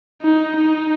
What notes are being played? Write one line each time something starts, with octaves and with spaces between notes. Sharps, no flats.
D#4
D#4